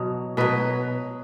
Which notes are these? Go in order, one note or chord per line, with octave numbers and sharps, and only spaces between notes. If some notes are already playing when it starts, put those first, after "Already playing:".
Already playing: B2 F#3
B2 F#3 B4